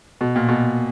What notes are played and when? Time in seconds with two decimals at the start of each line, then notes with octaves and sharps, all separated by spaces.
0.21 B2
0.36 A#2
0.48 B2